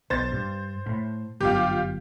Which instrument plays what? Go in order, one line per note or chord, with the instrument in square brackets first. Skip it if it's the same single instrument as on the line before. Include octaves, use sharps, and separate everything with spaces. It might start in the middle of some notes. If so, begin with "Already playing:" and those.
[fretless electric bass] B1 [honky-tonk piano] C5 A6
[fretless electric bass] G2
A2
[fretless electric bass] G1 F#2 [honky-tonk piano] F4 G4